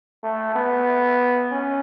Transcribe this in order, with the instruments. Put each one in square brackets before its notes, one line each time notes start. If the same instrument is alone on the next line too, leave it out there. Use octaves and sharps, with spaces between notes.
[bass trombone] A3
B3
C#4